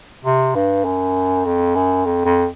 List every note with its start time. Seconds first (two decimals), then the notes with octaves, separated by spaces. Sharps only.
0.25 C3
0.55 G2
0.85 F#2
1.45 F2
1.75 F#2
2.05 F2
2.25 F2